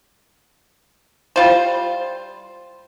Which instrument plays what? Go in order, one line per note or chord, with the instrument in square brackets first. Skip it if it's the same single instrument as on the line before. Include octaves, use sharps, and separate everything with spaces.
[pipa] G3 F4 C5